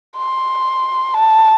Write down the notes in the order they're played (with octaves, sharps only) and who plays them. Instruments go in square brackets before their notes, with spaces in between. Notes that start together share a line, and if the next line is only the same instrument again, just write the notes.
[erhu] C6
A5